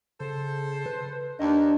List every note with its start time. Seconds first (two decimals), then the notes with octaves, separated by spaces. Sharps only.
0.20 C#3 A4 C5
0.86 B4
1.39 D#2 D4 D#5